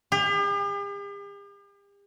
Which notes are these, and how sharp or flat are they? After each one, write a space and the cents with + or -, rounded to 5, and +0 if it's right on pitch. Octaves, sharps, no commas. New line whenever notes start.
G4 +45